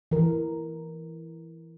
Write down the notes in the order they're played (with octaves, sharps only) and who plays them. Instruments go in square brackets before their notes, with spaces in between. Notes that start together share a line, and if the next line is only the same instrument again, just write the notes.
[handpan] E3 A#4